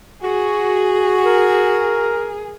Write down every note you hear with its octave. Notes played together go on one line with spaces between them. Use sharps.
F#4 G#4
A#4